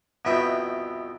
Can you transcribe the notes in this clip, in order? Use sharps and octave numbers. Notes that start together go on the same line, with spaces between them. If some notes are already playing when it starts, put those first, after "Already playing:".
C2 F2 B2 B4 E5 G5